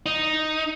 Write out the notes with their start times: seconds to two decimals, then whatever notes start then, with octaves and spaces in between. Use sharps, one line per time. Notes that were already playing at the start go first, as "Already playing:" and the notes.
0.06 D#4